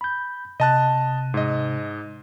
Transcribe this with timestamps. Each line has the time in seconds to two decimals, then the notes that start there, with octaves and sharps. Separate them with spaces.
0.01 B5 G6
0.60 C3 D#5 A5 F#6
1.34 G#2 D#5